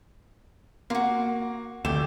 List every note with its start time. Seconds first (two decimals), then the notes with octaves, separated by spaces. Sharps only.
0.90 A#3 F4 F#4
1.85 F1 D2 A3 G4 E7